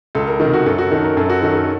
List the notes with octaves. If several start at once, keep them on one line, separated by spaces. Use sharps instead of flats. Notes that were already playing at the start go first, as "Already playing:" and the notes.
C#2 A4
A#4
D#3 A4
C3
F#4
F#2 A4
F#4
D#3 A4
A#4
F#2 A4
F#4
D#3 A4
A4